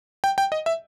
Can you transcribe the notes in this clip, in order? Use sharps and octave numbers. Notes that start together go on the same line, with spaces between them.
G5
G5
D#5
E5